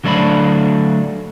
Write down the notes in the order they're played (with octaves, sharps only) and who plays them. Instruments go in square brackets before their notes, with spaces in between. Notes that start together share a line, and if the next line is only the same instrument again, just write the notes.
[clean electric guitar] D3 F#3 A3 D4 C5 B5